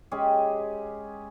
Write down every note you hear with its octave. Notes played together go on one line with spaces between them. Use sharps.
G#3 C#4 G4 G#4